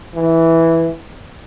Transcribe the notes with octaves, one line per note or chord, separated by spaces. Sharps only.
E3